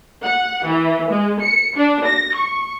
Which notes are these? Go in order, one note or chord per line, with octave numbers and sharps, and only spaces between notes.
F#5
E3
G#3
C#7
D4
A#6
C#6